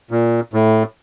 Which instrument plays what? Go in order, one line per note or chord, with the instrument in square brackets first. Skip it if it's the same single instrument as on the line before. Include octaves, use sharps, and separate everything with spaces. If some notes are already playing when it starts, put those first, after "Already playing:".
[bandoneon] A#2
A2